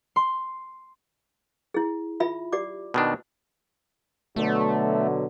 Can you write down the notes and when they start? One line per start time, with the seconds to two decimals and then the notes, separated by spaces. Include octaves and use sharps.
0.16 C6
1.74 E4 G#4
2.20 F4 E5 B5
2.52 G4 D5 D6
2.94 B2 D#3 D4
4.36 B2 D3 F#3 A3